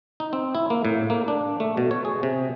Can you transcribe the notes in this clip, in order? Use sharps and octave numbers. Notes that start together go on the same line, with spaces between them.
D#4
C4
E4
A#3
A2
A#3
D4
A3
B2
C#5
G#4
C3